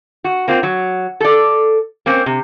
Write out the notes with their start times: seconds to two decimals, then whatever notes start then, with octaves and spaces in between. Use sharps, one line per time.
0.24 F#4
0.48 A#3 C4 F4
0.63 F#3
1.20 A4 D5
2.06 A#3 C4 C#4
2.26 C3